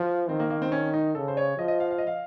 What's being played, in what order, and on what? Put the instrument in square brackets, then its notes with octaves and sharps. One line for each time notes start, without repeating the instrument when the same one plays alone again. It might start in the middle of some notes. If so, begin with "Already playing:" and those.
Already playing: [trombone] F3
[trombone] D#3 [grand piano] C4
[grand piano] A#3
A#3
C4
C#4
D#4
[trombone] C#3 [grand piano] A4
[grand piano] C5
C#5
[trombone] F3 [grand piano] D#5
[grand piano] D#5
F5
F5
D#5
F5